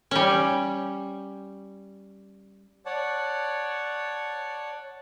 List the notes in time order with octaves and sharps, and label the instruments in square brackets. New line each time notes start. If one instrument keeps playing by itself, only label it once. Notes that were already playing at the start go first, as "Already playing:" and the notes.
[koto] G3 C#4
[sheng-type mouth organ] C#5 D5 F#5 A5